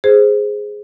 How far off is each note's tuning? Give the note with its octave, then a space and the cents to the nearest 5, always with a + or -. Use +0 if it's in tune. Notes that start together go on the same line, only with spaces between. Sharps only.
G#4 +0 C5 +0